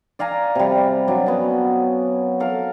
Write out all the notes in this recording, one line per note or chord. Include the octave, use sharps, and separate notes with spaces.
D5 F5 G#5 A#5
C3 G3
F#3 D4 D5
B3 C#4
A4 A#4 F5